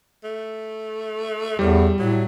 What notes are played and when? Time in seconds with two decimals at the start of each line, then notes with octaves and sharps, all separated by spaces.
0.24 A3
1.59 E2 A2 G3
1.99 A2 F#3